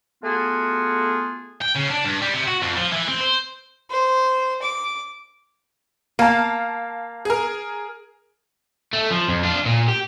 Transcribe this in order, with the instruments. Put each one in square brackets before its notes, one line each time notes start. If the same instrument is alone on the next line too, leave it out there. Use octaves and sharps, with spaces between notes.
[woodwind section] A3 B3 F4 F#4 G#4
[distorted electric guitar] G5
C#3
D4
G2
G3
C3
F#4
F2
F3
E3
C4
C5
[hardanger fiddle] C5
D6
[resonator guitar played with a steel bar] A#3 [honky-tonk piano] F5 A5
[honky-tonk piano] G#4 A#4
[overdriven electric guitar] A3
F3
F2
D4 F4
A#2
G4